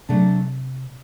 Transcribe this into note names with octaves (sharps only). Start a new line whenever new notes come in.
C3 F#3 A3 D4